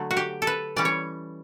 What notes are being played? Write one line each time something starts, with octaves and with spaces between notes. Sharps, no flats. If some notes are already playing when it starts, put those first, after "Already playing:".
Already playing: D3 F#3 A3
F#4
G4
A4
B4
E3 G3 C#4 D5
C#5